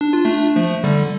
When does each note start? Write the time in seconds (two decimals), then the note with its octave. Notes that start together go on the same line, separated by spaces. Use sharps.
0.01 D4
0.13 F4
0.25 A3 D4
0.56 F3 A3
0.84 D3 G3